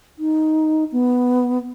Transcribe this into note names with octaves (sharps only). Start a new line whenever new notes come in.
D#4
B3